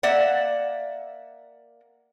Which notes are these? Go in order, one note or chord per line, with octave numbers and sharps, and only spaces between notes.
A#3 D5 E5 F#5